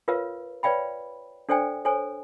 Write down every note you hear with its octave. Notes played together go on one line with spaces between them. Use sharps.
F4 A#4 B4 C#5 F5
B4 C#5 D5 F5 G5 B5
D4 A4 C5 D5 G5 G#5
A4 C5 C#5 G#5